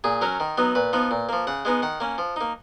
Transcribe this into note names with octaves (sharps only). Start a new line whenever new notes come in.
A#2 G#4
F#3 C#4 A#4
D#3
F#3 B3 D#4
A#2 B4
F3 B3 D#4
A#2
F3 A#3
C#3 F#5
G#3 B3 D#4
D#3 F#5
A#3 C#4
F3
A#3 D#4